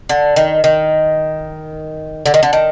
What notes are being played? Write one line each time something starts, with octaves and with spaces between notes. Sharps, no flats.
D3
D#3
D#3
D3
D#3
D3
D#3